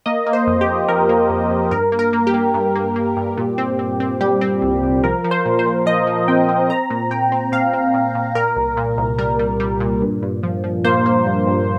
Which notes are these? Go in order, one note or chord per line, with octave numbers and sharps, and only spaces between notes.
A#3 D#5
A#3
C5
F2
G4
F2
F3 A#4
A#3
F2
F2
G2 A#4
A#3
A#4
A#3
G4
A#3
G2
A#3
A#3
G2
A#2
C4
C4
C4
G3 G4
C4
C2
C2
F3 A#4
F3
C5
A#2
C5
A#2
F3 D#5
F3
C4 G5
C4
C4 A#5
A#2
A#2 G5
C4
A#2 F5
C4
A#2
A#2
A#2 A#4
C2
A#2
C2
G3 A#4
G3
G3
A#2
G2
G2
F3
F3
A#3 C5
A#3
G2
G2